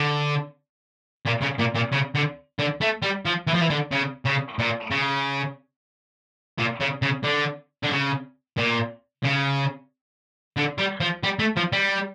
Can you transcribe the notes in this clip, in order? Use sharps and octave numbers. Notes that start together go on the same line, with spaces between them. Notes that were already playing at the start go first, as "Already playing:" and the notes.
Already playing: D3
A#2
C#3
A#2
A#2
C#3
D3
D3
A3
G3
F3
E3
F3
E3
D3
C#3
C#3
A#2
C#3
A#2
C#3
C#3
D3
D3
C#3
A#2
C#3
D3
G3
F3
G3
A3
F3
G3